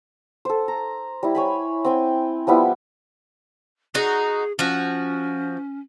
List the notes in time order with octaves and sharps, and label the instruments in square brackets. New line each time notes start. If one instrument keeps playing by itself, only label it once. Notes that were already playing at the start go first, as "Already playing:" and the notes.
[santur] A4 C5
A#5
G3 E4
C#5 G#5 B5
C4 G5 G#5
F3 G3 B3 E4
[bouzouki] D#4 F#4 [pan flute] G#4
[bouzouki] F3 F#4 [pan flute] C#4